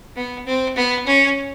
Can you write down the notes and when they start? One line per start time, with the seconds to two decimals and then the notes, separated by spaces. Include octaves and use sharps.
0.16 B3
0.46 C4
0.76 B3
1.07 C#4